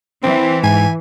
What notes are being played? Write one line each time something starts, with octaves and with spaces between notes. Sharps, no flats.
E3 C4
G#2 G#5